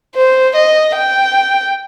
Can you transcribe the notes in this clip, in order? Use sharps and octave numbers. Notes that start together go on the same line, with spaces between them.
C5
D#5
G5